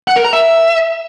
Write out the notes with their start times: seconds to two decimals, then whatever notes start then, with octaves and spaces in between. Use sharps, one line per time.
0.08 F#5
0.16 A#4
0.24 A#5
0.33 E5